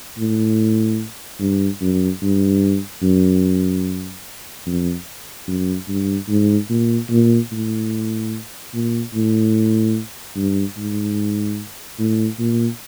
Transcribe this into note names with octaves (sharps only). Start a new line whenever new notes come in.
A2
G2
F#2
G2
F#2
F2
F#2
G2
G#2
A#2
A#2
A2
A#2
A2
G2
G#2
A2
A#2